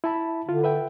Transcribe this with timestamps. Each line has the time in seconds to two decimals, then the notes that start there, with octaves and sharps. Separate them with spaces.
0.04 E4 A5 B5
0.49 D3 F4
0.64 B4 E5 G5